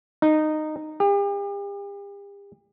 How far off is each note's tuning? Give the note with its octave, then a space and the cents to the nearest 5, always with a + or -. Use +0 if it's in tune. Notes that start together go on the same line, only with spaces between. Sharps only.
D#4 -15
G4 +40